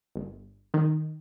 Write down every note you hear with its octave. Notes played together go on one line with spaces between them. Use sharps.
G1
D#3